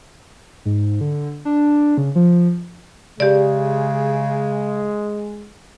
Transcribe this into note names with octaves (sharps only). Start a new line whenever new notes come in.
G#2
D3
D4
C#3
F3
C#3 G#3 G4 D5